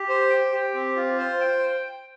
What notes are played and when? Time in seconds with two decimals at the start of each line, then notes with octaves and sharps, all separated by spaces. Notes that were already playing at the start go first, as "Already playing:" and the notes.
Already playing: G4
0.09 C5
0.30 G5
0.52 G4
0.74 C4
0.96 F4
1.18 C5
1.41 G5